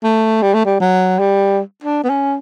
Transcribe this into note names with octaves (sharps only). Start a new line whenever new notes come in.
A3
G3
A3
G3
F#3
G3
D4
B3
C#4